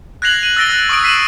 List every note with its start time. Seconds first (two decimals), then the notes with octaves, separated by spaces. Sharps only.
0.22 F#6 G#6 A#6 C7 F7 F#7
0.43 D#7 F#7
0.56 E6 A6 A#6 D7 G7
0.70 F#6
0.89 C#6 D#6 E6 D7
1.03 E6 B6 C7 D#7 E7 F#7